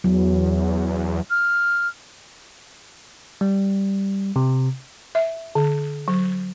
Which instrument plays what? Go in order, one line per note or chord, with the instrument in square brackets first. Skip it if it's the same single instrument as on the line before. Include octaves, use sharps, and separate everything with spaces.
[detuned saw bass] E2 [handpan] F#3
[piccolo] F6
[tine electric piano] G3
C3
[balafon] E5
D3
F#3